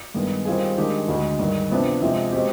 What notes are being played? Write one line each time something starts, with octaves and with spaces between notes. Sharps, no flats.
G2 D#3 G#3 B3
D#3 G3 C4 F4 G#4
D#3 G#3 D4 G4
D2 D3 G#3
G2 D#3 G#3
C3 F3 B3 D4
C3 F3 G#3
B2 G#3 C4 G4